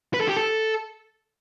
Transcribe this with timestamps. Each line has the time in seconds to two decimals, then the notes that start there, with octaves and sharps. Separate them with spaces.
0.14 B4
0.21 A4
0.28 G4
0.37 A4